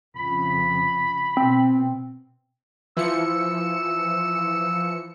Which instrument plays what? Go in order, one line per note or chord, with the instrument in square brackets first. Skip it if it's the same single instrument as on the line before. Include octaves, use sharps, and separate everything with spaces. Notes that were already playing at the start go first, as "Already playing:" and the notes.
[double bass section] F2 C#3 [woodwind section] B5
[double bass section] B2 [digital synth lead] C4
[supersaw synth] E3 F3 C#7 [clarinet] E6